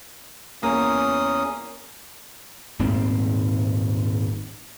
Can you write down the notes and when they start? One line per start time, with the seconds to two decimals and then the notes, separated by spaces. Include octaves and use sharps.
0.63 E2 A#3 C#4 D#6
2.79 D#1 G#2 C4